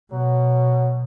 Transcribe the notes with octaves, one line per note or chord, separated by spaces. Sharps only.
B2 F#3